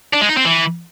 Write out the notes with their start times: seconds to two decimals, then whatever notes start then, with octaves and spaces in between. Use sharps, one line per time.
0.13 D4
0.21 G#3
0.29 D#4
0.37 C4
0.45 E3